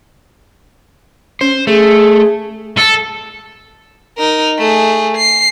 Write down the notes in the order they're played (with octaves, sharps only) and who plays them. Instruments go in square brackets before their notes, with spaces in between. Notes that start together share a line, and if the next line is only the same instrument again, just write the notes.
[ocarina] C#4 [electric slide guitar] C5
[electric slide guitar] A3 [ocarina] G#4
[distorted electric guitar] A4
[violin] D#4 A#4
A3 G#4
C7